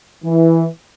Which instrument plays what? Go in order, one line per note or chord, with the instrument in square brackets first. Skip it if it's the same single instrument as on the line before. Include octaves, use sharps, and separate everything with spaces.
[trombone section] E3